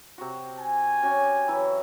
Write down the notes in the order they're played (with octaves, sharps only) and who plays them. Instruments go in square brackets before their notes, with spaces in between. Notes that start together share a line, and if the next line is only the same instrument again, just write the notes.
[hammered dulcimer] C3 F#4
[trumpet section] G#5
[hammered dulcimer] C#4 F#4 G4
E3 F#3 E4